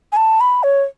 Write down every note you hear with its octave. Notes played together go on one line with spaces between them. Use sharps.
G#5
A5
B5
C#5